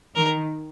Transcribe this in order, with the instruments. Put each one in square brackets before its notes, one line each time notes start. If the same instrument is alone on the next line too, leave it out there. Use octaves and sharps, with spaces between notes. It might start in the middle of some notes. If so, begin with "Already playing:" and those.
[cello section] D#3 [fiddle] A#4